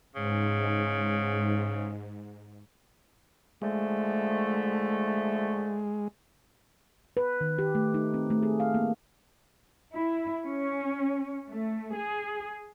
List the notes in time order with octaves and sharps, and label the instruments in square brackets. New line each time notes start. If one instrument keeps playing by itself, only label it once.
[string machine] G#2 [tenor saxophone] C#3
[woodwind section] D3 F3 A3 [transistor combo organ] G#3
[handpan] B4
D#3
G4
A3
D#4
C4
A3
G#4
F5
A#3
[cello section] E4
C#4
A3
G#4